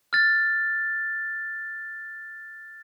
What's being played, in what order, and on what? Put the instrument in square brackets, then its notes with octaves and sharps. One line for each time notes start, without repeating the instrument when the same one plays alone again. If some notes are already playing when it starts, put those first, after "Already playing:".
[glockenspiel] F6 A6